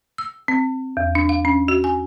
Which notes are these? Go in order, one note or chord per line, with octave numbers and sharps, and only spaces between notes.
E6
C4
E2
D4
F5
C#4
F#4
G#5